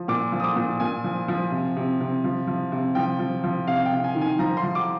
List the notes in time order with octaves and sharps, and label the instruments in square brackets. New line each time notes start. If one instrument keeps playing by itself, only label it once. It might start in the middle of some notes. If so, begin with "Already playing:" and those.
Already playing: [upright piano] F3
A#2 D6
F3
D#6
D6
A#2
A#2 G#5
F3
F3
C3
C3
C3
F3
F3
C3
F3 G5
F3
F3
C3 F5
G5
C3
G#5
D#3
G#5
F3 A#5
C6
F3
D6